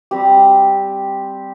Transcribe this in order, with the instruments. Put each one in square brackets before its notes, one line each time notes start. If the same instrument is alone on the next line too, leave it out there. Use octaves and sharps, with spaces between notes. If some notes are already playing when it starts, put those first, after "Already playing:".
[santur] G3 C4 G4